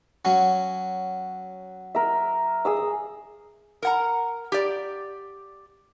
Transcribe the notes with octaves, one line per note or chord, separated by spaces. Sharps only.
F#3 C#4
A#4 E5
G#4 D#6 E6
A#4 F#5 A#5
G4 D5